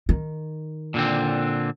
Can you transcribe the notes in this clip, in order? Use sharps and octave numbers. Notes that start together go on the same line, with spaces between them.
D#3
A#2 D3 C4